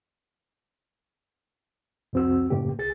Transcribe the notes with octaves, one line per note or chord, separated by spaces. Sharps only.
C2 F2 C4 F#4 E6
F#2 A2 C#3 A#3 G4
C2 G#4 A6